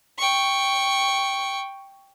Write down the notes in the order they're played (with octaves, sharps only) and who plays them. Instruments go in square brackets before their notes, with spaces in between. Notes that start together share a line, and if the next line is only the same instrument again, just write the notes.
[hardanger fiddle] G5 C#6